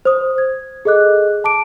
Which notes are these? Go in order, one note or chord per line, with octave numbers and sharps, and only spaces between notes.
C5 D#6
G#6
G#4 A4 D#5 D6 F#6
A5 D6 D7